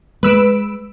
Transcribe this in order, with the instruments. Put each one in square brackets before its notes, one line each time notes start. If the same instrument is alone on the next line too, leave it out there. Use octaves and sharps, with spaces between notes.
[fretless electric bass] G#3 [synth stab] B4 E6 D7